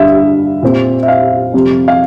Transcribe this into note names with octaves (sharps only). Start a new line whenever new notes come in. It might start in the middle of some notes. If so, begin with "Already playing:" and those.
Already playing: G2 D3 G3 E5 F5
A#2 G3 C4
E5
F5
F2 C3 G3
F5